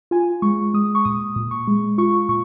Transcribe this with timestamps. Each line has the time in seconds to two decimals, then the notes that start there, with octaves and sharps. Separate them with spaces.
0.11 F4 G#5
0.42 G#3 C#6
0.74 G#3 D#6
0.95 C#6
1.05 A#2 D#6
1.36 A#2
1.51 C#6
1.67 G#3
1.98 F4 C#6
2.29 A#2 C#6